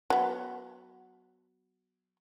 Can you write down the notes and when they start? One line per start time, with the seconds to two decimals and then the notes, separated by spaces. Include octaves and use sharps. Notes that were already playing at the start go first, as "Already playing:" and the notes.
0.10 F#3 B3